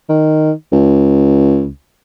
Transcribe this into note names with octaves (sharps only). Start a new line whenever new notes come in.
D#3
C#2